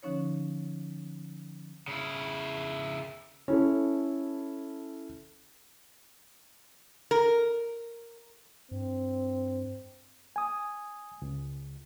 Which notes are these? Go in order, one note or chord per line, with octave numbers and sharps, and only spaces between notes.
D3 F3 C#4 D#4 C#5
C#3 E4
C#4 E4 A4
A#4
G2 C4
G#5 D#6
C#2